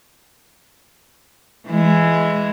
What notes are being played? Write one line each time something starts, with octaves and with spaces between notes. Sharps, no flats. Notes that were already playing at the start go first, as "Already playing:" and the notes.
E3 G#3